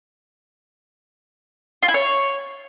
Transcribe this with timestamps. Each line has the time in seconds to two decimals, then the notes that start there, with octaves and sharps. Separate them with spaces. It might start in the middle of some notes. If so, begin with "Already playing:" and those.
1.83 F4
1.88 E4
1.94 C#5